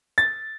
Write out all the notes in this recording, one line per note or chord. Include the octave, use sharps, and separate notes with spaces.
A6